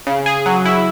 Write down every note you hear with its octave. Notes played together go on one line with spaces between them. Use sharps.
C#3
G#4
F#3
E4